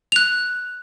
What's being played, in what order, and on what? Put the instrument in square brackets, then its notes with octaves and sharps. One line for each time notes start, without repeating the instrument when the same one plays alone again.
[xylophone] F#6 F7